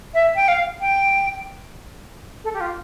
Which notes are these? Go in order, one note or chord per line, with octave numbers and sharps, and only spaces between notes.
E5
G5
F5
G5
A4
G4
F4